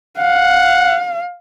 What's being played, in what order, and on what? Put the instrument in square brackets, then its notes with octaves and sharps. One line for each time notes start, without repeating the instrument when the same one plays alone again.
[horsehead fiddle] F5 [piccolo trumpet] F#5